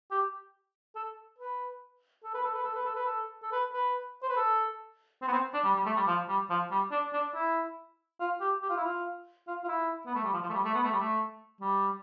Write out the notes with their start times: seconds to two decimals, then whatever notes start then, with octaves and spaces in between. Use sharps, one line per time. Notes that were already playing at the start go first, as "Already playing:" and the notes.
0.11 G4
0.95 A4
1.38 B4
2.24 A4
2.34 B4
2.44 A4
2.55 B4
2.64 A4
2.75 B4
2.85 A4
2.96 B4
3.06 A4
3.42 A4
3.52 B4
3.73 B4
4.22 C5
4.29 B4
4.37 A4
5.22 C4
5.27 B3
5.32 C4
5.54 D4
5.64 G3
5.75 G3
5.86 A3
5.96 G3
6.07 F3
6.29 G3
6.50 F3
6.71 G3
6.92 D4
7.13 D4
7.34 E4
8.20 F4
8.41 G4
8.62 G4
8.69 F4
8.77 E4
8.84 F4
9.47 F4
9.64 F4
9.68 E4
10.06 B3
10.15 A3
10.24 G3
10.33 F3
10.43 F3
10.49 A3
10.54 G3
10.65 A3
10.75 B3
10.83 A3
10.92 G3
10.99 A3
11.61 G3